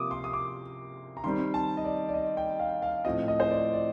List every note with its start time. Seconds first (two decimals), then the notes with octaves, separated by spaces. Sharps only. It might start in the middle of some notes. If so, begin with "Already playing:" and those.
Already playing: C3 F3 A#3 D6 D#6
0.11 C6
0.24 D#6
0.33 D6
1.17 A#5
1.24 D#3 G3 C4 C6
1.54 A5
1.77 D#5
1.84 D5
2.09 D5
2.14 D#5
2.37 G5
2.59 F5
2.82 F5
3.05 A2 F3 C4 D#5
3.28 D#5
3.40 C5
3.50 D5
3.73 D5